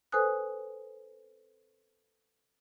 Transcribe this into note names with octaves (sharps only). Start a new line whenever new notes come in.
A4 B4 C5 G#5 D#6 F#6